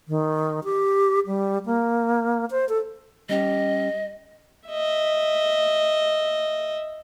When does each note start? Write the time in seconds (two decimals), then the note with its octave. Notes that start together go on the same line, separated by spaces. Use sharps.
0.08 D#3
0.64 G4
1.27 G3
1.66 A#3
2.51 C5
2.69 A4
3.29 G3 C#4 G4 D#5
4.69 D#5 E5